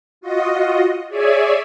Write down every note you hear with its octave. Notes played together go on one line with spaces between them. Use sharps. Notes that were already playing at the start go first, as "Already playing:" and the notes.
F4 F#4 D#5
G#4 C#5 D5 E5 G#5